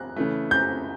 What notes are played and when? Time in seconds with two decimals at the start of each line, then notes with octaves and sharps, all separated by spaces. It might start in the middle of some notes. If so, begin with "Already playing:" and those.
Already playing: F#6
0.16 C#3 E3 A3
0.51 G6